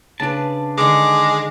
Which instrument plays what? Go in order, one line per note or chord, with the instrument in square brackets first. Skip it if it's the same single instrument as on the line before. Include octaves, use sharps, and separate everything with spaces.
[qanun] C#3 B4 [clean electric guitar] D4 A5
[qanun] D3 D#3 C#6 [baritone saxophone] G#3 [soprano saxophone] D6